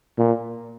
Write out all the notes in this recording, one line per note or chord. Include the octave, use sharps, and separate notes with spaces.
A#2